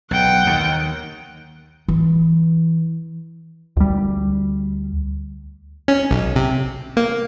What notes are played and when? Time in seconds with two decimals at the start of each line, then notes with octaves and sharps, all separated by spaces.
0.11 B1 F#5 G5
0.47 D#2 D#3
1.88 E3
3.77 D2 G3
5.88 C#4
6.11 B1
6.36 C3
6.97 A#3